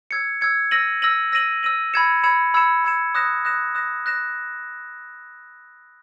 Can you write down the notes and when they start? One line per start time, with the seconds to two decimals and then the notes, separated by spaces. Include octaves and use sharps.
0.11 E6 G#6 C#7
0.41 E6 G#6 C#7
0.71 E6 A#6 D#7 F#7
1.02 E6 A#6 D#7 F#7
1.32 E6 A#6 D#7 F#7
1.63 E6 A#6 D#7 F#7
1.94 B5 E6 G#6 C#7 E7
2.23 B5 E6 G#6 C#7 E7
2.54 B5 E6 G#6 C#7 E7
2.84 B5 E6 G#6 C#7 E7
3.15 D#6 F#6 A#6 E7
3.45 D#6 F#6 A#6 E7
3.75 D#6 F#6 A#6 E7
4.05 D#6 F#6 A#6 E7